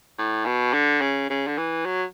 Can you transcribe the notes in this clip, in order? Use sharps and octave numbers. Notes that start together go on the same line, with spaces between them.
A2
B2
D3
C#3
C#3
D3
E3
F#3